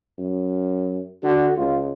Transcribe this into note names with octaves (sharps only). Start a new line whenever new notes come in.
F#2
D3 F#4
C#2 F4